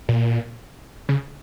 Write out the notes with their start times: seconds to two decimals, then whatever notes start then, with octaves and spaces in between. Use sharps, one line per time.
0.09 A#2
1.09 C#3